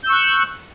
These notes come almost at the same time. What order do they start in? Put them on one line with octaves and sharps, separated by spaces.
G6 E6 C#6 F#6